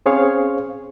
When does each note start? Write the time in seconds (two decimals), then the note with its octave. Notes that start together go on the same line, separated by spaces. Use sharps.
0.06 C4 C#4 G#4 C5 C#5 F5